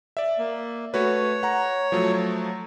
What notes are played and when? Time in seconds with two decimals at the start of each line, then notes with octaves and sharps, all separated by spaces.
0.17 D5 E5
0.39 A#3
0.94 A3 F#4 B4 C#5
1.43 F#5 A#5
1.92 F3 F#3 A3